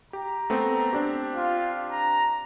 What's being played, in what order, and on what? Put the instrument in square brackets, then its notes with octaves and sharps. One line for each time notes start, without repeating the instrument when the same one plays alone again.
[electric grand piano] G4 [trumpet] A#5
[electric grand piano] A3 B3 C4
C4 D4 G4
[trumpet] F4
A#5